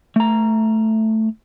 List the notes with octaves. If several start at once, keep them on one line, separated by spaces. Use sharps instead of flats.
A3 A#5